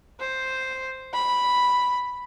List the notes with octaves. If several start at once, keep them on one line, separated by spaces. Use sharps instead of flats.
C5
B5